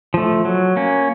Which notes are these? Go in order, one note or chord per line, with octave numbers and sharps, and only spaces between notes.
F3 A3
F#3
A#3 C#4